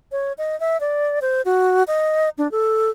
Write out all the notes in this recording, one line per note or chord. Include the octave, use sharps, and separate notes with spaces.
C#5
D#5
E5
D5
C5
F#4
D#5
D4
A4